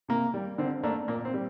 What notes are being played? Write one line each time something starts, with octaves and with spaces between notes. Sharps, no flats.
C3 A#3
G3
D3 C4
A3 A#3 D4
A#2 A#3
C4
G3